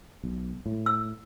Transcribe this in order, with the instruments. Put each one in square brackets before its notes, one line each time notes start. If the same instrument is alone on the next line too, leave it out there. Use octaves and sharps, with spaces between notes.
[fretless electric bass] B1
A2
[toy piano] E6